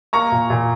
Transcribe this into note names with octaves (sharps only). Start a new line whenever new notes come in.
A#3 A#5 C#6
A#2
A#2